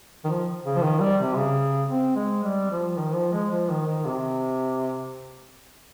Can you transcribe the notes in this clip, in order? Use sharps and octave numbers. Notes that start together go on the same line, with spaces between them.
D#3
F3
C#3
F3
D#3
G3
C3
C#3
C4
G#3
G3
F3
D#3
F3
G#3
F3
D#3
D#3
C3